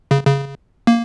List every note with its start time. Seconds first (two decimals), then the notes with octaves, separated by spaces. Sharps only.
0.11 C#3
0.26 C#3
0.87 A#3